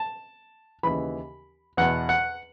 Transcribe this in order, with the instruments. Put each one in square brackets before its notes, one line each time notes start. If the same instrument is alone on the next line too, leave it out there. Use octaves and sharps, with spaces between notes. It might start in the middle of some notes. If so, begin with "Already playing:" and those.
Already playing: [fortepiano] A5
D#2 C#3 E3 B5
E2 B2 F#5
F#5